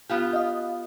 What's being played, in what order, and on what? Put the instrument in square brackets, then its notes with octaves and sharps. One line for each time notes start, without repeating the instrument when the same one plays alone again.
[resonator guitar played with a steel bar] B3 F4 G4
[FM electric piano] D#5 F5